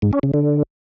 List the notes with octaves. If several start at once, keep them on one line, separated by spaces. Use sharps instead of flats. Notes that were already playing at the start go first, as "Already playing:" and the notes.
G#2
C#4
C#3
D3